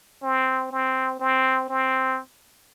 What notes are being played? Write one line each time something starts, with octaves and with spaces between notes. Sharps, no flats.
C4
C4
C4
C4